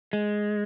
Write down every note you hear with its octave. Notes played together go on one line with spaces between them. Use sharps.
G#3